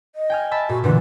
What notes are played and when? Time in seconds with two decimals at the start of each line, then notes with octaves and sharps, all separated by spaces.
0.15 D#5
0.30 G5 G#5 F6
0.51 E5 A5 B5
0.69 A#2 F#4
0.84 A#2 D3 E3 B4